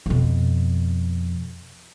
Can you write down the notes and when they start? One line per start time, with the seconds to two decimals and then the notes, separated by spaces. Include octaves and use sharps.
0.06 F2 B2